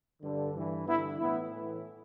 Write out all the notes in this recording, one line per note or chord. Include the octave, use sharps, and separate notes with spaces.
G2 D3
G2 E3
G2 D3 B3 E4
A2 E3 B3 E4
A2 E3